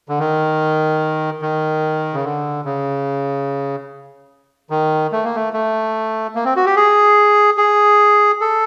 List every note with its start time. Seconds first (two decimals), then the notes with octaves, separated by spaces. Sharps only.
0.09 D3
0.19 D#3
1.42 D#3
2.14 C#3
2.24 D3
2.65 C#3
4.70 D#3
5.12 A3
5.24 A#3
5.35 A3
5.53 A3
6.35 A#3
6.45 C4
6.56 F#4
6.66 G4
6.76 G#4
7.58 G#4
8.41 A4